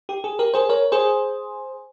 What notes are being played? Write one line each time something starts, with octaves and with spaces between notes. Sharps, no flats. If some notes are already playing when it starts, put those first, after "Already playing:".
G4
G#4
G4 A#4
G#4 C5
A#4 C#5
G#4 C5